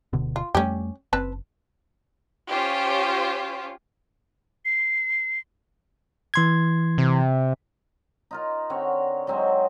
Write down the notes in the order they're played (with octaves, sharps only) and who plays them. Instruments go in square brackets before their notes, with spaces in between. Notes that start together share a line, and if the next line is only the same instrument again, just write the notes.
[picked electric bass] D1 B2 D3
[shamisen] F4
[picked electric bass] F2 G3 A3 [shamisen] C#4 G4
[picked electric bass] F#1 [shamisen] C4 B4 A5
[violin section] C#4 F4 G4 C5 C#5
[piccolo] C7
[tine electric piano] E3 C6 G#6
[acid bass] C3
[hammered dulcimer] D#4 F4 A#4
D3 C4 C#5 F#5
F#3 G#3 C4 D#4